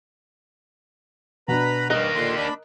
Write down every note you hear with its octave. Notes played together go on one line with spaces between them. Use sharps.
B2 D4 B4 A#5 B5
G2 A#3 D#4 A#4 D#5 F#6
A#2 D3 C6
D4 B5